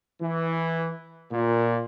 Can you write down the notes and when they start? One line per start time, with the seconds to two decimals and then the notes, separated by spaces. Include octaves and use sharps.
0.21 E3
1.32 A#2